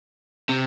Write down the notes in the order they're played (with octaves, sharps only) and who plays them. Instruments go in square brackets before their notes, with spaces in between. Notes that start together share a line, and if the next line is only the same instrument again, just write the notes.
[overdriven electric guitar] C3